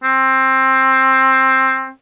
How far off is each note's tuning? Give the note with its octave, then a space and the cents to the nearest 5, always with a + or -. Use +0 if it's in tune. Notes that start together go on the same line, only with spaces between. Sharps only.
C4 +15